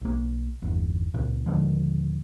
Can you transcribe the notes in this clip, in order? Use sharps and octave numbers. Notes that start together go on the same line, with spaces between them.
B1 A#3
G1 E2
C#2 A#2
D#1 D3 F3 G#3